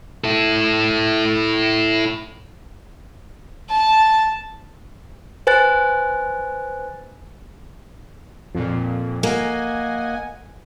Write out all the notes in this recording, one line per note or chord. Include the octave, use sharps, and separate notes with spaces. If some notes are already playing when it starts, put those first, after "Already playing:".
E4 A4
A5
B4 C5 G#5 F#6 A6
F2 A#2 F3
A#3 D#5 F#5 G#5